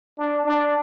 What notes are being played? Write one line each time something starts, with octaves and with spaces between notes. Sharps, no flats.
D4
D4